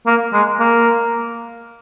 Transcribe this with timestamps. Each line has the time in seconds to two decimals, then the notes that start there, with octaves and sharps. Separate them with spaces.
0.07 A#3
0.33 G#3
0.60 A#3